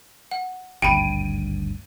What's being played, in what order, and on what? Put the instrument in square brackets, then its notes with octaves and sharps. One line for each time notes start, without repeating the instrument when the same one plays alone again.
[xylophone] F#5
[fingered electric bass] G#1 D2 G2 [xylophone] G5 B5 [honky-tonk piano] D7 D#7